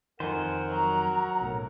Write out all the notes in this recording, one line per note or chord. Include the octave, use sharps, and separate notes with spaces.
F2 D#3 A#4 C5 F#5 G#5
F#3 A#5
B1 A2